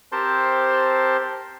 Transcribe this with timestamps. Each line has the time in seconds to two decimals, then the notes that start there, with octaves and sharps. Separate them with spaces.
0.12 C4 G4 A#4 C5 A5 C6